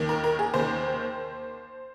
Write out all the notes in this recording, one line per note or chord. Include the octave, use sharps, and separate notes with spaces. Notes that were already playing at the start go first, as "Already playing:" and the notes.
Already playing: D#2 D#3
A#4
A#4
G#4
D#2 D#3 C5